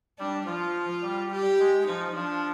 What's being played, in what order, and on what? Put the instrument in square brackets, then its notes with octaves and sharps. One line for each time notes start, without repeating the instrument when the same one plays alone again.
[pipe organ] G3 [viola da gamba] D4
[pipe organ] F3 [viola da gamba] F4
[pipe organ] G3
[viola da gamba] G4
[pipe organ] G#3
[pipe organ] F3 [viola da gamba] D#4
[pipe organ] F3 [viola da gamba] D4